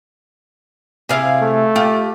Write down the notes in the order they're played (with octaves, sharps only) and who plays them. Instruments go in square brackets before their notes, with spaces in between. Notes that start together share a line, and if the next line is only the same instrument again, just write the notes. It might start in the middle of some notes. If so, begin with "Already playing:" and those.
[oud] C3 F5 [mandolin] E4 F4 G#4
[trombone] A3
[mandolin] F4 [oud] G4